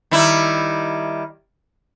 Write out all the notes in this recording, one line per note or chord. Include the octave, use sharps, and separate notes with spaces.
D#3 G3 E4